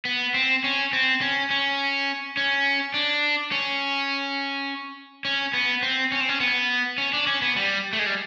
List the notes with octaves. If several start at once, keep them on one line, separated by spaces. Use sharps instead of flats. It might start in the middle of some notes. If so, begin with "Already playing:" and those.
B3
C4
C#4
C4
C#4
C#4
C#4
D4
C#4
C#4
B3
C4
C#4
C4
C#4
B3
C#4
D4
C#4
B3
G3
A3
G#3
G3